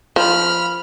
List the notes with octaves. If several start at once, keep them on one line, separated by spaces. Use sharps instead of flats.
F3 B5 F6